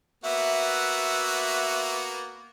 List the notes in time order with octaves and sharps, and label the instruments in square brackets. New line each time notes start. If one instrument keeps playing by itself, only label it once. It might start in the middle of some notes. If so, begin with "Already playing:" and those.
[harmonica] A#3 B3 F#4 [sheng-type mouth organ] E5